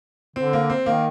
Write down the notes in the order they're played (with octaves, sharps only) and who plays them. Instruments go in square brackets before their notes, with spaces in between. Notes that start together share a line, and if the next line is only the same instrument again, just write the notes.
[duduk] D3 [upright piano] C4
[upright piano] A#3
C4
[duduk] D#3 [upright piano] A#3